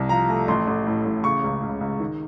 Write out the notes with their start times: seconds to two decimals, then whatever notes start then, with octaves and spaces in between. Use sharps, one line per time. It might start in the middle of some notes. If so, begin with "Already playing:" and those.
Already playing: C2 C3
0.09 F3 A#5
0.29 A3
0.48 A1 C6
0.67 A1
0.87 A2
1.06 A1
1.24 C#3 C#6
1.43 C#2
1.63 C#2
1.80 C#2
2.00 D#3